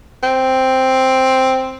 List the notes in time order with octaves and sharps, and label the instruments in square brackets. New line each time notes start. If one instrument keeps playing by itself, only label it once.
[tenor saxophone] C4